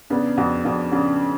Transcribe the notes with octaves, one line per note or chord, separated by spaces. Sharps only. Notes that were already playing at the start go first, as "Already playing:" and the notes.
C#3 B3 D4
F2 D4 F#4
F2 D4 F#4
C#3 D4 F#4